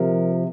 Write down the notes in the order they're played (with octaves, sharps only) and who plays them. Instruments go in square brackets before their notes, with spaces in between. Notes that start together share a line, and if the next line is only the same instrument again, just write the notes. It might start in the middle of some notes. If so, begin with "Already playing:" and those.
Already playing: [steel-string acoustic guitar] C3 F3 A#4